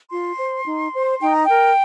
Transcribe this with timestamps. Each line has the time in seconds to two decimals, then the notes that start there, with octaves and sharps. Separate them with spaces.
0.10 F4 C6
0.38 C5
0.65 D#4
0.92 C5
1.21 D#4 G5
1.32 A#5
1.44 G5
1.49 A#4